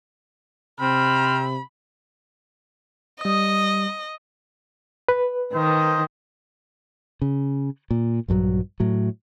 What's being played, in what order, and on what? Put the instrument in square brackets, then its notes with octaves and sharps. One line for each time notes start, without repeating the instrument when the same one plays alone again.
[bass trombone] C3 [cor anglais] C4 [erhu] B5 [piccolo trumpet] F6
[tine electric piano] G3 D#6 [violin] D#5
[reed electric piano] B4
[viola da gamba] D#3 [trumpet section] A#3 C5 D#5
[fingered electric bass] C#3
A#2
A#1 G2 F3 F#3
A2 F#3